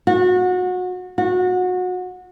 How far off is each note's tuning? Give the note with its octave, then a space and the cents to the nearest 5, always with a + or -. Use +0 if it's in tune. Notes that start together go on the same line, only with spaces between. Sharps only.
F#4 -25
F#4 -25